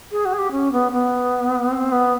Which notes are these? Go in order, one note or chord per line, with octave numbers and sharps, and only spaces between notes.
G#4
F#4
G#4
G4
C#4
B3
B3
C4
B3